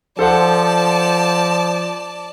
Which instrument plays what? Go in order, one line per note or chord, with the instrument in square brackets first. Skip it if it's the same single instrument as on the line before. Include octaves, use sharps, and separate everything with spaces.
[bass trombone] F3 [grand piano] A4 C5 F#5 [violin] D5 A5